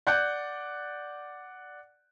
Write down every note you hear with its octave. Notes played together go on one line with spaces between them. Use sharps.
D5 F#5 F#6 G6